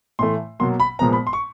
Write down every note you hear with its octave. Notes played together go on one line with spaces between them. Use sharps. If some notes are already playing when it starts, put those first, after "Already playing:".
A2 E3 A3 C6
B2 F#3 A#3 C6
B5
A#2 F3 G#3 B3 A#5
B5
C6
C#6